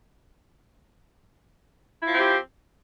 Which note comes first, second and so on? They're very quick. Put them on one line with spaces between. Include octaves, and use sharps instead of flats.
E4 F3 C4 G4